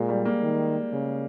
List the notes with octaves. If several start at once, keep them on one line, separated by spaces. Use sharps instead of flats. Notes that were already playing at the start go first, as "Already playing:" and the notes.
Already playing: A#2 G#3
G3
A#3
D#3
C#3